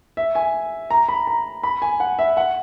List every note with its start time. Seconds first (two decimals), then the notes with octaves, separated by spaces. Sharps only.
0.17 E5
0.35 G#5
0.90 A#5
1.09 B5
1.27 A#5
1.63 B5
1.82 G#5
2.00 F#5
2.19 E5
2.37 F#5